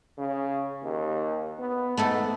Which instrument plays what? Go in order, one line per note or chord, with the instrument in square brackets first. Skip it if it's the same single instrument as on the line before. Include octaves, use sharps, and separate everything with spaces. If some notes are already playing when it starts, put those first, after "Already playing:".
[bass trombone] C#3
D#2
B3
[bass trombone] G#2 [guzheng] A3 B3 A4